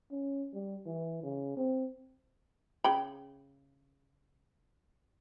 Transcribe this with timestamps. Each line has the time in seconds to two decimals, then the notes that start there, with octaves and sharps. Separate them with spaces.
0.11 C#4
0.53 G3
0.86 E3
1.23 C#3
1.57 C4
2.84 C#3 G5 B5